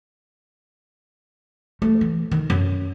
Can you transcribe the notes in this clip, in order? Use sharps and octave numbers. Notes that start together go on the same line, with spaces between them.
A3
E3
D#3
F#2